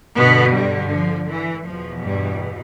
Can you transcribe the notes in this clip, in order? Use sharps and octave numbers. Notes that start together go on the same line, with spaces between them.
G2 B2 D3 B3
G2 G3
F3
E3
E2 B2 F3
G2 G3